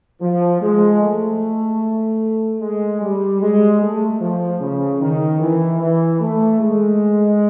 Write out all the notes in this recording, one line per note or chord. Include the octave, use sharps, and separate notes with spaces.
F3
G#3
A3
G#3
G3
G#3
A3
F3
C#3
D#3
E3
E3
A3
G#3